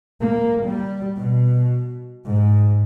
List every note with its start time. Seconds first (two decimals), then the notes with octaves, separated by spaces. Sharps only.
0.22 A#3
0.67 G3
1.19 B2
2.28 G#2